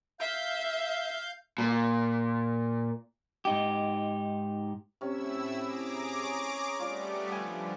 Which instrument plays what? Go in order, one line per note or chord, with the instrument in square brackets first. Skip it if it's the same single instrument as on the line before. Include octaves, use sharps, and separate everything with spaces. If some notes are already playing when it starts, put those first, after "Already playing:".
[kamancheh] E5 [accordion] F5 G6
[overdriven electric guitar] A#2
[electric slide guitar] G#2 D#4 G4
[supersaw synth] A2 E4 E6 [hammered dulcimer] C3 C#4
[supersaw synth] G#4 A#5 D6
[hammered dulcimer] C#5
[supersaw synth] G3 A3 B3 [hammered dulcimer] F4 D5
[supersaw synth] D3 F3 [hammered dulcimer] G#5